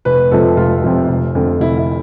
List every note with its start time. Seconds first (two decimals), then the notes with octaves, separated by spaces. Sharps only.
0.05 F1 B4
0.31 F2 C3 F3 A4
0.57 F1 F4
0.84 F2 C3 F3
1.09 F1
1.35 F2 D3
1.61 F1 E4
1.78 E4